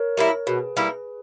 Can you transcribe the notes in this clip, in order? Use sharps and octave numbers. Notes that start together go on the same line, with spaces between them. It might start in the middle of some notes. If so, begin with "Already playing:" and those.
Already playing: A#4 C#5
G3 A#3 E4
B2 G#4 B4
G3 A#3 E4